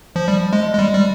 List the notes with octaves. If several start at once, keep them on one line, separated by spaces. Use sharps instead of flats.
F3
G3
G#3
G#3
G3
G3